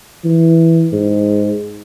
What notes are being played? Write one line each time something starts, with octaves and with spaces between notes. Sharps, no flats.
E3
G#2